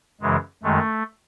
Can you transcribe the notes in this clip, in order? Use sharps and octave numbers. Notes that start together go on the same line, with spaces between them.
F#2 C#3 E3 G#3
F#2 D#3 G#3 A3